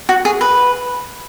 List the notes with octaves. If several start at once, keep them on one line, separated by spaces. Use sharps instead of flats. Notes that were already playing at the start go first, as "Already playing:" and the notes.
F#4
G#4
B4